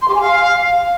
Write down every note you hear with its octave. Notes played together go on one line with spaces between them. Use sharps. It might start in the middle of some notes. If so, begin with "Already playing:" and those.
C6
G4
G#5
F5